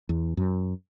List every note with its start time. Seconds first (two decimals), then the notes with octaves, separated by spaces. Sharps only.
0.09 E2
0.37 F#2